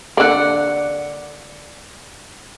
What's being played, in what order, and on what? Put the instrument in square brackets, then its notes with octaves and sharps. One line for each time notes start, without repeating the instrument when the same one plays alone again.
[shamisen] D3 A#3 [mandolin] D5 F#5